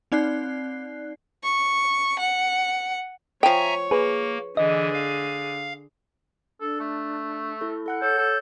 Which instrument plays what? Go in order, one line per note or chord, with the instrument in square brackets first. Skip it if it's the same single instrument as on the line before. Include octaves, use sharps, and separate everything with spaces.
[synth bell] C4 D#4 D5 F#6 C7
[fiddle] C#6
F#5
[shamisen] F3 G5 [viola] C#5 [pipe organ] E5 G#5 A#5
[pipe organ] A#3 [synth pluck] G#4 B4
[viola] D3 G#4 [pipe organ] E3 [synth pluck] D#5
[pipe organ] F5
[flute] D4 [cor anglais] A4
[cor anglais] A3
[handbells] E4 A4
A4 F#5 F#6
[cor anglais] A4 [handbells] C#5 [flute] G6
[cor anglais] A4